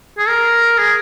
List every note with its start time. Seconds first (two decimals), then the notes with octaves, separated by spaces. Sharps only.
0.18 G#4
0.28 A#4
0.78 G#4